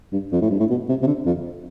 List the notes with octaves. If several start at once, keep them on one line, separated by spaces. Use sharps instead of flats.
G2
F2
A2
G2
A2
B2
C3
C3
D3
F2